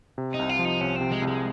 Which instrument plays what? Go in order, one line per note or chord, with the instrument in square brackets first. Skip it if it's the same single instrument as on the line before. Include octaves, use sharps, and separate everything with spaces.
[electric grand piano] C3
[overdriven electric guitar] D#4
[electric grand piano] C2
[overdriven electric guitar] F4
[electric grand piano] F3
[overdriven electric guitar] D#4
[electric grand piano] C2 [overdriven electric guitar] C#4
[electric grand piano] C3 [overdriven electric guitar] C4
[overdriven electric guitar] G#3
[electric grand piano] C2
[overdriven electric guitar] G#3